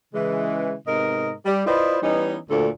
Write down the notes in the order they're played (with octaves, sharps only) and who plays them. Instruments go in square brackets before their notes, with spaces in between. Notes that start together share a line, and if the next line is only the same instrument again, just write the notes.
[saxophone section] C#3 E3 G#3
G#2 C3 B3 A#4 D#5
G3
E4 F4 B4 C5 D5 D#5
E3 G3 B3 C#4 D#4
D2 A#2 A4